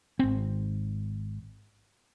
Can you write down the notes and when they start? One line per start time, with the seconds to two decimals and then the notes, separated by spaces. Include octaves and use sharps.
0.19 G#1 C4